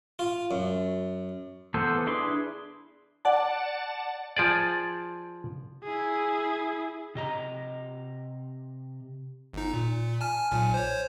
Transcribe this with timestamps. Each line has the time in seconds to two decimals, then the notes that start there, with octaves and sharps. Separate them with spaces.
0.19 F4
0.51 F#2
1.74 E3 B3 A4 C5
2.07 D4 E4 G#4 B4 C6
3.25 D5 F#5 A5
4.37 F3 G#4 D5
5.84 E4 G#4
7.15 C3 D#5 A#5
9.53 G1 D#4
9.73 A#2
10.21 G#5 A5 F6
10.51 B1 A#2 G#5
10.74 C5 C#5